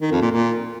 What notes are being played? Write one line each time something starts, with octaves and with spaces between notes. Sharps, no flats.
D#3
F2
A#2
A#2